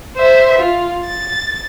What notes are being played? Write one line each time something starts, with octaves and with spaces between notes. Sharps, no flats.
C5 E5
F4
A6